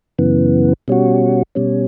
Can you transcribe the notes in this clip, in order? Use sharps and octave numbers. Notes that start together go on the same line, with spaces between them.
F#2 C#3 E3 B3
B2 G3 C#4 F#4
B2 G3 C#4